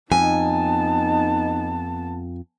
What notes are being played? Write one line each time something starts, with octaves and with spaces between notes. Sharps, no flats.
F2 B3 D#4 G#5 A5